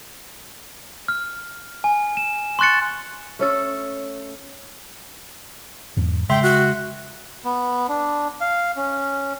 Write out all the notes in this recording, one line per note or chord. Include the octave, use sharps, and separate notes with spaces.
F6
G#5
E7
C6 C#6 F#6 A6 C#7
A3 C#4 A4
E2 G#2
C#3 G#3 E5 G5 C6
F#4
B3
D4
F5
C#4